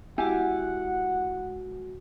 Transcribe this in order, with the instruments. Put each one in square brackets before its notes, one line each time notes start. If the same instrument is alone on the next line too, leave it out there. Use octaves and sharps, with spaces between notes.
[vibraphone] G#3 F#4 [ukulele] E4 G4 G#5 [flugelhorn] F#5